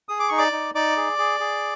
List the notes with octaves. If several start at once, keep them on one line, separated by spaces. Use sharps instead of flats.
G#4 D#6
D6
D#4 C#6
D5 D6
D#4
D#4 D5 D6
G#4
G#4
G#4